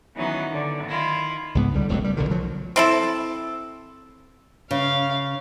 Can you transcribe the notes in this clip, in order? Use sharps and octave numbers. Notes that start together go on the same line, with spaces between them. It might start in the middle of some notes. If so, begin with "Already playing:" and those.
D#3 E3 F#3 B3 C#4 D#4
D3
D#3 E4 F4
C#2 G#2 B3
C#2 D3 G3
F1 C#2 C3 F#3
G3
B1 D3 D#3
F3 F#3
C4 E4 A4
C#3 F5